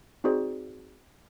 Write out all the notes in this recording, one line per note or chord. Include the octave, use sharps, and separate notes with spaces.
C4 D#4 F#4 G#4 C5 D5